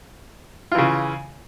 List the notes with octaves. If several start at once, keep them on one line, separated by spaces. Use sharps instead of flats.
C#3 E3 F4